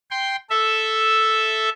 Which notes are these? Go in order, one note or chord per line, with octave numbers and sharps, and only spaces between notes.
G5 C6
A4 E5